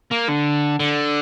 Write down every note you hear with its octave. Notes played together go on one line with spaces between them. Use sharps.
A#3
D3
D3